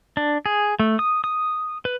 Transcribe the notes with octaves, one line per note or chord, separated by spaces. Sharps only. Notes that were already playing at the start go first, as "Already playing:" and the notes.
D4
G#4
A3
D#6
D#6
B4